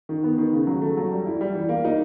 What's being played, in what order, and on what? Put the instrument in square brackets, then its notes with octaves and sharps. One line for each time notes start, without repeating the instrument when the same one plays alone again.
[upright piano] D#3
B3
D#3
C#3
F#3
A3
F#3
G3
E4
G3
E3
A#3
D#4